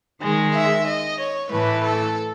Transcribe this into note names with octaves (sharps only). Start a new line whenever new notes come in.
D#3 G#3
E5
D#5
C#5
A2 E3 A3 B4
A4